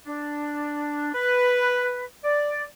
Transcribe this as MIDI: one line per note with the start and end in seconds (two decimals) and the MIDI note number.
0.06 1.12 62
1.13 2.05 71
2.24 2.63 74